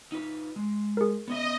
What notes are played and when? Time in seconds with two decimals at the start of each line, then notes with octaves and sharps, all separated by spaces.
0.12 D#4 F4 B4
0.56 G#3
0.97 G#4 A#4
1.28 B3 C#4 D#5 E5